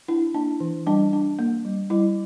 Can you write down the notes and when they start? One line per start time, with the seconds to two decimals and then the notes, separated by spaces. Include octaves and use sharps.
0.08 D4 E4
0.34 A#3 D4
0.60 E3
0.86 G3 D4
1.13 D4
1.39 A#3
1.65 G3
1.90 G3 E4